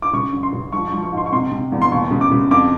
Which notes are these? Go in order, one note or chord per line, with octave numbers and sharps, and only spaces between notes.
D6
C#3 C#6
F#2
C6
C#3
F3 C#6
C#6
F3
C#6
G#2 C6
C#6
C3 C6
C3
E2
C6
D#2 C#6
C#3
D6
C#3
F2 D6